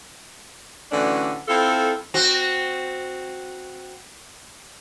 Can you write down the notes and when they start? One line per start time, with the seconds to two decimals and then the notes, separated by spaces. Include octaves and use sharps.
0.92 A2 D3 E3 F#3 C#4 D4
1.48 C4 E4 F4 A4
2.14 C4 F#4